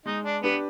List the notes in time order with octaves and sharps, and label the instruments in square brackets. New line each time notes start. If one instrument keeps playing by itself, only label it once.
[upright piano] G#3 [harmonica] D#4
[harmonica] D4
[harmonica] B3 [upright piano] D4 G4 B4